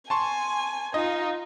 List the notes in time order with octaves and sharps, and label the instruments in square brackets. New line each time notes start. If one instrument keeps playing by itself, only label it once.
[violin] G#5 [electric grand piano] A5 C6 C#6
[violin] D#4 F4 [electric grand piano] D#5